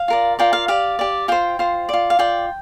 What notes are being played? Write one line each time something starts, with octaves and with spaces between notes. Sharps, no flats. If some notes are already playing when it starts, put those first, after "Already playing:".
Already playing: F5
F4 A#4 D5
F4 A#4 D5 G5
F5
G4 D5 F5
G4 D5
F4 C5 G5
F4 C5
F4 D5
F5
F4 D5 G5